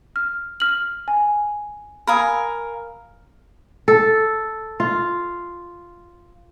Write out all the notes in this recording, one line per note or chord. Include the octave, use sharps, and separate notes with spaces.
F6
F6 F#7
G#5
A#4 F5 G#5 B5 D#6 E6
A4
F4